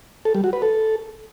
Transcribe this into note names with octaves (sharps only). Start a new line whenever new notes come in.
A4
G3
F#4
B4
A4